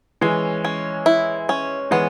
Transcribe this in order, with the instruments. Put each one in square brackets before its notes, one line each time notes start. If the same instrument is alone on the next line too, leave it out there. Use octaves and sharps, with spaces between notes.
[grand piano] E3 G#3 [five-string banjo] C#4
[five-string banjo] C#4
E4
C#4
[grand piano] E3 G#3 [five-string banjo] B3